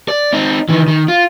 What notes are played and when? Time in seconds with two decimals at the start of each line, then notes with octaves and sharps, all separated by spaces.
0.08 D5
0.33 C4 D#4
0.69 D#3 E3
0.88 D#3
1.08 F4